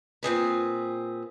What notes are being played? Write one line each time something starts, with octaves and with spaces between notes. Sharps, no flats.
A#2 C4 G#4 B4